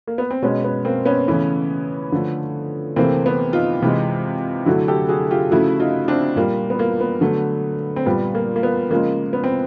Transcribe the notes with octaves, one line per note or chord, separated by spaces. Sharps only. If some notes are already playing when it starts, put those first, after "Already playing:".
A#3
B3
C4
B2 G#3 B3 C#4
B3
A#3 C4
B3 C#4
C#3 E3 A3
D3 F3 A3
C3 E3 A3 A#3 C4
B3
D#4 F4
C3 E3 G#3
D3 F#3 A3 E4 F#4
G4 A4
F#4 G#4
F4 G4
C#3 F3 A3 E4 F#4
D#4 F4
C4 D4
A#2 G3 A#3
B3
A#3
B3
D3 F#3 A3
C4
A#2 G3 B3
A#3
A#3
B3
C#3 F3 G#3 A#3
B3
C4